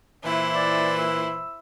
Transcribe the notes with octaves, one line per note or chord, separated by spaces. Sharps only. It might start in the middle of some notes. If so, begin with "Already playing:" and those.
A#2 E3 E4 C5
D5
E6